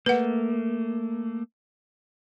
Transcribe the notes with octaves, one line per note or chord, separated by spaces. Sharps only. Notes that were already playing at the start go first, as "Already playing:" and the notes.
A3 A#3 B4 F#5